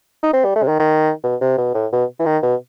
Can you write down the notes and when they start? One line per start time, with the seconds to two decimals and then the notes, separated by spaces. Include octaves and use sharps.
0.23 D#4
0.33 C4
0.44 G3
0.56 A3
0.63 C3
0.68 D#3
0.79 D#3
1.24 B2
1.41 C3
1.57 B2
1.74 A2
1.92 B2
2.19 E3
2.26 D#3
2.43 B2